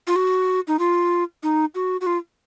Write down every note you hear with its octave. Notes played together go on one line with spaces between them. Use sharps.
F4
F#4
D#4
F4
D#4
F#4
F#4
F4